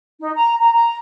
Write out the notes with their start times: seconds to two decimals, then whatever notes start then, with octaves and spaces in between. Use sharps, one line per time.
0.20 D#4
0.36 A#5
0.60 A#5
0.73 A#5